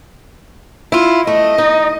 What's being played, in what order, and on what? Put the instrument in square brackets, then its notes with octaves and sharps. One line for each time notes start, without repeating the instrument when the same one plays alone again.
[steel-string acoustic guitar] E4 F4
[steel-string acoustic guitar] A3 [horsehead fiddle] D#5
[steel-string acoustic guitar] D#4